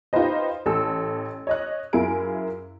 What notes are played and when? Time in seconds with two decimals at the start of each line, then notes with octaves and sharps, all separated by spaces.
0.13 D#4 F4 G4 B4 C5 D#5
0.66 A1 A4 E6
1.47 C#5 D#5 F#6
1.93 F#2 E4 F4 G#4 A#4 D7